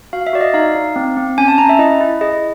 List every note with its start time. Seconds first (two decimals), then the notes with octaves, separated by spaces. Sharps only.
0.13 F#4 F5
0.27 E5
0.33 F#4 D5
0.41 D#5
0.54 D#4 F5
0.76 D#4
0.96 C4
1.17 C4
1.38 C#4 G#5
1.48 A5
1.58 C#4 A#5
1.69 E5
1.79 E4 D#5
2.01 E4
2.21 G#4 D#5